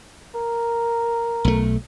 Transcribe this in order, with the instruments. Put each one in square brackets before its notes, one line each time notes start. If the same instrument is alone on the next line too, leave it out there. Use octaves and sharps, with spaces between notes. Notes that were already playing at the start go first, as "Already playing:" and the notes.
[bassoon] A#4
[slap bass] B1 A3